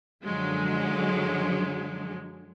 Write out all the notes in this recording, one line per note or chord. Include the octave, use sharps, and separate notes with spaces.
F#2 D3 F3 F#3 G#3